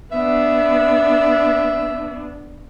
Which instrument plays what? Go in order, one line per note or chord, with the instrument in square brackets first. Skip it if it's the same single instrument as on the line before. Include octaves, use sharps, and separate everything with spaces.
[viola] B3 D4 [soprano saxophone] E5